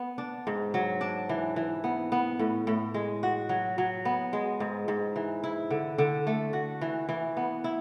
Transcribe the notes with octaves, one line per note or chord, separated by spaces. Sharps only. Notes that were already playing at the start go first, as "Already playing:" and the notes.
Already playing: B3
D4
G#2
F#3
D4
E3
E3
B3
B3
A2
A2
G#3
F#4
F#3
F#3
B3
G#3
G#2
G#2
E3
E4
D3
D3
A3
F#4
E3
E3
B3
E4